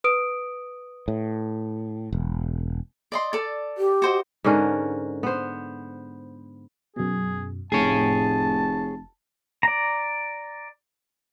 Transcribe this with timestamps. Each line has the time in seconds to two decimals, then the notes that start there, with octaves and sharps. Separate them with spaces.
0.04 B4 D#6 D7
1.08 A2
2.12 E1
3.12 D5 D#5 C6
3.33 A4 D5
3.78 G4
4.02 F#4 C5 D#5
4.44 G#2 D3 C#4 A#4
5.23 B3 C5
6.96 F#2 B2 G#4
7.72 F1 A2 G#4 C#5 A5
9.63 D5 A#5